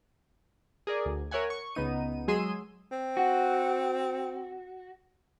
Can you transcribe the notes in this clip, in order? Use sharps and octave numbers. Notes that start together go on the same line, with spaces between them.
G#4 A#4 D5
D2
A#4 C#5 E5 F#5 G#5
C#6
C#2 B3 D#4 D#7
F#3 G#3 G#4 C6 E6 D#7
C4
F#4